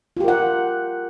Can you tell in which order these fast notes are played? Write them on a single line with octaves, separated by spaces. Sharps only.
F4 G4 A#4 F#5